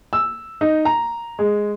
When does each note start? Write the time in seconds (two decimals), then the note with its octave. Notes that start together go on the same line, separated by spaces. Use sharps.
0.13 E6
0.61 D#4
0.85 A#5
1.39 G#3